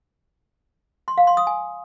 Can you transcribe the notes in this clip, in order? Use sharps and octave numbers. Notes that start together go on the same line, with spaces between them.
C6
F5
C6
D#6
G#5